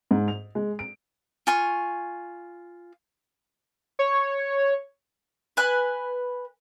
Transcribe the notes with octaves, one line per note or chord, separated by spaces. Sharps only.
G#2
F7
G#3
D7
F4 G#5 C#6
C#5
B4 G#5 F#6